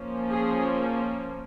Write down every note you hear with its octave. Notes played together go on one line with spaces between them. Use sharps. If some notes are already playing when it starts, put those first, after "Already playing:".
Already playing: F3 A#3 C#4
G#4